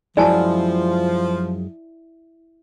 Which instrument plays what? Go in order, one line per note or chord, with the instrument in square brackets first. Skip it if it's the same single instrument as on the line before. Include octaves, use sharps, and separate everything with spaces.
[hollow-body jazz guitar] F#2 F#3 G#3 [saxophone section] F3 [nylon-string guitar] E4 [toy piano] D5 G#5 A5